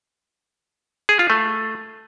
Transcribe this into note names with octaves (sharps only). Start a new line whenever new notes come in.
G#4
F4
A3